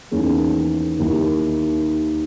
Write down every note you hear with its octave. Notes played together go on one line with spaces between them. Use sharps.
E2 D#3 A#3 C#4 G#4
D#2 D#3 A#3 E4 G4